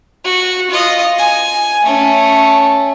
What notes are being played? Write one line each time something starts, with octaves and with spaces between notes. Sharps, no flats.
F#4
F4 D#5
G#5
A3 C#4